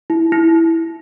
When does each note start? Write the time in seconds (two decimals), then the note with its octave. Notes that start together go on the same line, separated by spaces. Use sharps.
0.10 E4
0.32 E4